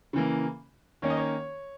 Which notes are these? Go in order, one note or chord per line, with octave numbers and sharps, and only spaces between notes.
C#3 E3 A#3
D#3 A#3 C#4 C#5
D#5
C#5